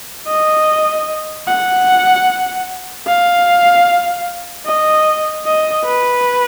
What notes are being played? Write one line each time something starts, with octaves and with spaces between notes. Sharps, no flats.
D#5
F#5
F5
D#5
D#5
B4